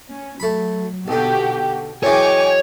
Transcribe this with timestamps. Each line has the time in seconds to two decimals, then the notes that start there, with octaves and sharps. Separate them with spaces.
0.11 C#4
0.40 F#3 A3 B5
1.08 B1 B2 D3 F#4 G4
2.03 F#2 E3 G#3 C#5 G5 G#5 D6